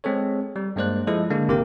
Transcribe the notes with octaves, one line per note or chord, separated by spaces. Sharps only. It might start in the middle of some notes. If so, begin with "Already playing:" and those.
G#3 C4 G#4 A4 C#5
G3
G2 G#3 A#3 C5 D5 F#6
F3 G#3 E4 A4 D#5
D3 G#3 A#3 D4
G#1 C3 A#3 G4 A#4 G5